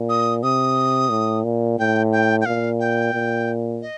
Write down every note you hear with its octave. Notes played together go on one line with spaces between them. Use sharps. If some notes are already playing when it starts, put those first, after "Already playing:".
Already playing: A#2
D#6
C3 D#6
A2
A#2
A2 G5
G5
G5
A#2 F5
G5
A#2
D#5